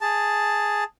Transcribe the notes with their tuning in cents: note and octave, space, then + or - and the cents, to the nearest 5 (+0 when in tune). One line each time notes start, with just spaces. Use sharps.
G#4 +0 A5 +5